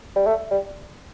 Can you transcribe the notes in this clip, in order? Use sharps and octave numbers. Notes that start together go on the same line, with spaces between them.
G3
A3
G3